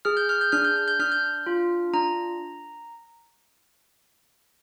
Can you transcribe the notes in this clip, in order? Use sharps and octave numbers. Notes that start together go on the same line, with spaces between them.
G#4 F6
G6
F6
G6
D4 F6
G6
F6
G6
D4 F6
G6
F6
F4
D4 A#5